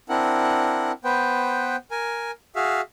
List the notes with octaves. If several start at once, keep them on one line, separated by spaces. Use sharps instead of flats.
C4 D4 E4 A#4 F#5
B3 B4 C5 G5
A#4 G#5
F#4 G#4 E5 F5